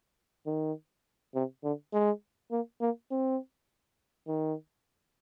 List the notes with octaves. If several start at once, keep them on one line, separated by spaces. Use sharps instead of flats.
D#3
C3
D3
G#3
A#3
A#3
C4
D#3